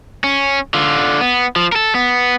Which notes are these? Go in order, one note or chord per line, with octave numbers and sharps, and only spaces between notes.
C#4
D3 F4
B3
F3
A4 A#4
B3